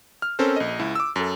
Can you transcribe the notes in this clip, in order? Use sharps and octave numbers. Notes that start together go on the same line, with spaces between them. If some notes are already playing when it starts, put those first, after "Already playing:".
F6
C4 C#4 A4 A#4 C5
A#1 D#5
C#2 E4
D6 E6
F#2 A4